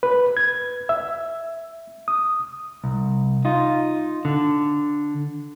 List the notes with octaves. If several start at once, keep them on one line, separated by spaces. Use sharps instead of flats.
B4
G#6
E5
D#6
C2
D#4 F4
D3